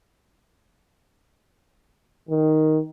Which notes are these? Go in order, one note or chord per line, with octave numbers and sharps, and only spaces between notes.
D#3